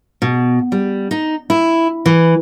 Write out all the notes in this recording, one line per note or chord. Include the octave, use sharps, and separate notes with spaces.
B2
G3
D#4
E4
E3